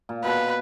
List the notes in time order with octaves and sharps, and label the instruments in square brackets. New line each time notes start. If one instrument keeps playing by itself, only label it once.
[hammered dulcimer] A#2
[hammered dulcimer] B2 [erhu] B4